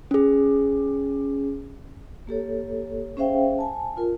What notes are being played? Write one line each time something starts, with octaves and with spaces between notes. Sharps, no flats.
C#4 G#4
A#3 G4 A4 C#5
C#4 G#4 C5 E5 F5 G5
G#5 A5
F4 A#4